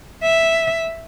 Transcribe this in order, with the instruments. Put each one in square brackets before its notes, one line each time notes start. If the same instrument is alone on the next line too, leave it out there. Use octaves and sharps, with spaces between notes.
[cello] E5